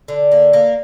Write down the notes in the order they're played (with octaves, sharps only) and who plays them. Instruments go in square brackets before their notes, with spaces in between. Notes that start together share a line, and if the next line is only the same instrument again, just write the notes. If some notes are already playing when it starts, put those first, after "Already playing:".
[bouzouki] D3
A#3
A#3